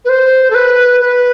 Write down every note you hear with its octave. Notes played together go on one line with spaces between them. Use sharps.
B4
C5
A4
B4
B4